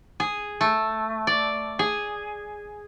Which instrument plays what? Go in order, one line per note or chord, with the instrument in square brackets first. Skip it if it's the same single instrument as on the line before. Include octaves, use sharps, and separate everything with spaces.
[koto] G#4
A3
D5
G#4